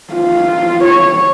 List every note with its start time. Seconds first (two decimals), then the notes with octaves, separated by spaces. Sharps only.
0.13 F4
0.84 C#5